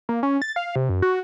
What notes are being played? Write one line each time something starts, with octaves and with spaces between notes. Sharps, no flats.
A#3
C#4
A6
F5
C3
F#2
F#4